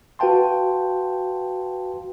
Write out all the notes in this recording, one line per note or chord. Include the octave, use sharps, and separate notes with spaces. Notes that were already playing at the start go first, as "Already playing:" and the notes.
F#4 B4 F5 G5 A5 C6